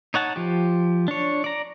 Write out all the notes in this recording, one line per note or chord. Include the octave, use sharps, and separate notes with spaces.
D#4 C#5 F#5 A5
F3 G4
D4 C#5
D5 A#5